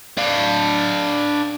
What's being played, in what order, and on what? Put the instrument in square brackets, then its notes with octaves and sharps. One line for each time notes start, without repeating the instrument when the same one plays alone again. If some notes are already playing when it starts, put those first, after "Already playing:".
[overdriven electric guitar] D4 F5